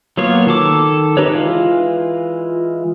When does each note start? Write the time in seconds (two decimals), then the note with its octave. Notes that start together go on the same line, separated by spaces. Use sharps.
0.17 F#3 A#3 B3 F4 C#5
0.47 D#3 A4 D6
1.17 D#4 G4 B4 C#5
1.32 E3 G#3 F4